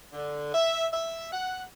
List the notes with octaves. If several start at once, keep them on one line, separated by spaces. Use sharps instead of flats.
D3
E5
E5
F#5